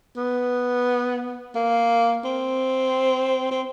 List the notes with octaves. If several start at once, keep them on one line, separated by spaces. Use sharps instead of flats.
B3
A#3
C4
C4